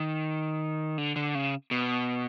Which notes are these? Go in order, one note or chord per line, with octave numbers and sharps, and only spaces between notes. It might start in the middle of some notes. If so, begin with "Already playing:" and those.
Already playing: D#3
D3
D3
C#3
B2